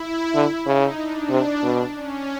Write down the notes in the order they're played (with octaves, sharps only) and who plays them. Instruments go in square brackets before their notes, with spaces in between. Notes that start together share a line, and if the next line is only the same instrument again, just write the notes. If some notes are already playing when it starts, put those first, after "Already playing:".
Already playing: [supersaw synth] E4
[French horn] D3
[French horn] C#3 [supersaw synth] D#4
[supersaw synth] D4
[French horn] C3
B2
[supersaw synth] C#4